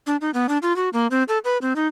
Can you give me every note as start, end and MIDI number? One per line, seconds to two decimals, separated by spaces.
0.07 0.16 62
0.21 0.31 63
0.34 0.47 59
0.49 0.58 62
0.62 0.75 65
0.76 0.89 66
0.93 1.07 58
1.11 1.23 60
1.28 1.38 69
1.45 1.58 71
1.62 1.73 60
1.76 1.87 63